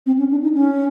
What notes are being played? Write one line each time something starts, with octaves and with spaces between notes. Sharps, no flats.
C4
C#4
D4
D#4
C#4